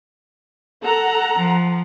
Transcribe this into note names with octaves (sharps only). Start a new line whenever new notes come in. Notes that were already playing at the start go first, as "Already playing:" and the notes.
A4 F#5 A#5
F3